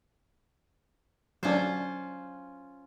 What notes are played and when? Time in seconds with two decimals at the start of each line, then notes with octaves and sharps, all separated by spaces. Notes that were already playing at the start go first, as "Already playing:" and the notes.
1.43 F#3 C#4 D4 F4 C5